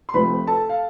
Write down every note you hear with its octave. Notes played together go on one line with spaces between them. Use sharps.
C6
C3 F3 A3 C4 B4 B5
A4 A5
F5